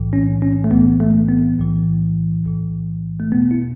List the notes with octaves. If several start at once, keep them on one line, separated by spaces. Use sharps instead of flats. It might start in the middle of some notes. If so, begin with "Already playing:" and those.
Already playing: B1 A2 E3
C#4
C#4
A3
B1 A2 E3 B3
A3
B3
B1 A2 E3
B1 A2 E3
A3
E2 B2 B3
E4